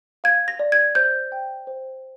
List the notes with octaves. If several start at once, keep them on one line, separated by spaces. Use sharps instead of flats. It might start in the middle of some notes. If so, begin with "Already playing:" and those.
F5 G#6
A#6
D5
G#6
C5 G6
G5
C5